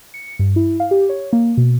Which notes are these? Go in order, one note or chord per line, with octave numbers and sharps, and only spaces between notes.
C#7
G2
E4
F5
G4
C#5
A#3
B2